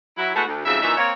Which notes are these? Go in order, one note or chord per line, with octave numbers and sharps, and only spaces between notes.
F#3 E4
G#3 A3 B3 E4 F#4 A4
D2
F2 G#2 C#3 F#3 E5
F#2 A#2 E3 D#4 E5
A#3 C4 C#5